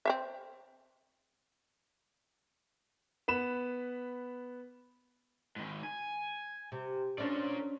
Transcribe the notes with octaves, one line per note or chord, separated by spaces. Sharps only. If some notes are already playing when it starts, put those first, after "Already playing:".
C4 C5 E5
B3 B5 E7
G#2 D#3
G#5
C3
C#4 D4 A#4 C5 D5